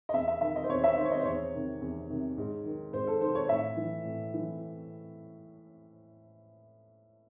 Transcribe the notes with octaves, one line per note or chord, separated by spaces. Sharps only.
D#5
E2 E5
E5
D#3 E5
D#5
C5
E2 C#5
E5
D#3 C5
C#5
D#5
C5
E2 C#5
C3 D#3
E2
C3 D#3
G#2
D#3
G#2 C5
A4
D#3 C5
C#5
A2 E5
E3
A2
E3